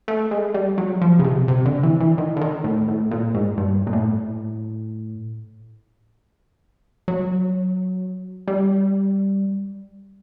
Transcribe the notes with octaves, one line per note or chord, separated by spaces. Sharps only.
A3
G#3
G3
F#3
F3
C#3
C3
C3
D3
E3
E3
D#3
D3
D#3
A2
A2
A#2
G#2
G2
A#2
A2
F#3
G3